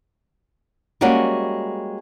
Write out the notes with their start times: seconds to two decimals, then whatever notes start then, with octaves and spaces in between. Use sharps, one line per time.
1.01 G3 G#3 A#3 C#4 F#4